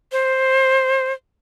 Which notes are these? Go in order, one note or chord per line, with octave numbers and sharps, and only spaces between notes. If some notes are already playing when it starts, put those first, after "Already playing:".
C5